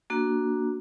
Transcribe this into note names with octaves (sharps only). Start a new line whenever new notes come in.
A#3 D4 F#4